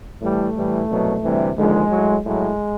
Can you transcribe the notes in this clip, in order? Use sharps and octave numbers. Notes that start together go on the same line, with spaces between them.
A2 E3 G3 A3
A2 E3 G3
C2 B2 F#3
D2 C3 E3 G3
D#2 D3 F3 G#3
A2 F#3
A2 F#3 G#3